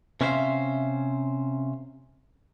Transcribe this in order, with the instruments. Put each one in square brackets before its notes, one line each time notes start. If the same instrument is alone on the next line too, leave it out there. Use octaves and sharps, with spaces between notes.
[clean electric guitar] C3 C#4 B4 C5 E5 F5